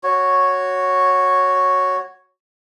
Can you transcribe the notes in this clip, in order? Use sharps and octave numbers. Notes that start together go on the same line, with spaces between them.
F#4 C#5